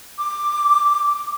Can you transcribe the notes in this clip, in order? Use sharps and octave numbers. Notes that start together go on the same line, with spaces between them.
D6